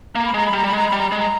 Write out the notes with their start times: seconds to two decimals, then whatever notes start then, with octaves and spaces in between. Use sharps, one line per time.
0.15 A#3 A#5
0.25 B5
0.34 G#3 A#5
0.46 B5
0.53 G3
0.57 A#5
0.64 G3 B5
0.73 G#3 A#5
0.88 G3 B5
0.99 A#5
1.08 G#3 B5
1.19 A#5